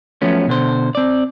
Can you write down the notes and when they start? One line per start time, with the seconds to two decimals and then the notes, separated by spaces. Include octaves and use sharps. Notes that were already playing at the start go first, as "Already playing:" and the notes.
0.22 F3 F#3 A3 B3 C#4
0.47 B2 D3 C5
0.95 C4 D5